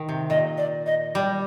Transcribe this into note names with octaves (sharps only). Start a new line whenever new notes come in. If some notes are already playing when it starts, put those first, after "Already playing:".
Already playing: D#3
C3
A#2 D#5
D5
D#5
G3 D5